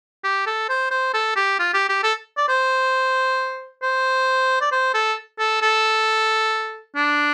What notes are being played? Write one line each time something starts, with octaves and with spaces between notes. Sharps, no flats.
G4
A4
C5
C5
A4
G4
F4
G4
G4
A4
D5
C5
C5
D5
C5
A4
A4
A4
D4